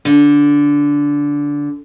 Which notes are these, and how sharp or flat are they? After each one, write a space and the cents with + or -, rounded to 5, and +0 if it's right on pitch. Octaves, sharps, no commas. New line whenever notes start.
D3 -15